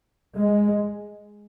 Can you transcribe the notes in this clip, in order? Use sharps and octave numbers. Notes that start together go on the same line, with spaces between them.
G#3